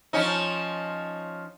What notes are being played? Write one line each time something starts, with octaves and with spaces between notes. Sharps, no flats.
F3 C#4 D#4